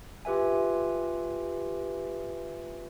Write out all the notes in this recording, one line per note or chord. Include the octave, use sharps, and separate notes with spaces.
F4 G4 B4 E5 G#5